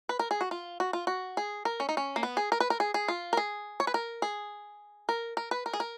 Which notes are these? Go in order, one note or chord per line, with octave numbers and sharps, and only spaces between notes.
B4
A#4
G#4
F#4
F4
F#4
F4
F#4
G#4
A#4
C#4
D#4
C#4
A#3
B3
G#4
A#4
B4
A#4
G#4
G#4
F4
A#4
G#4
C#5
B4
A#4
G#4
A#4
A#4
B4
A#4
G#4
A#4